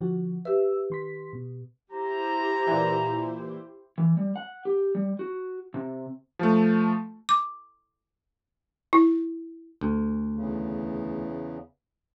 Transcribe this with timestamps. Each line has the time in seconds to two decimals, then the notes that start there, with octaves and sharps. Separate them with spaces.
0.01 D3 F3 F#4
0.45 G4 B4 E5 E6
0.90 D#3 C6 B6
1.33 B2
1.92 E4 G4 C5 A#5
2.67 A#2 E3
3.98 E3
4.17 G3
4.36 F#5
4.65 G4
4.95 G3
5.19 F#4
5.74 C3
6.39 F3 A3
7.29 D6
8.93 E4
9.81 D2
10.35 E2 C#3